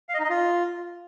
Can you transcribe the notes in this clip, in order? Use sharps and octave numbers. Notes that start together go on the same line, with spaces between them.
F5
D#5
D#4
D#5
F4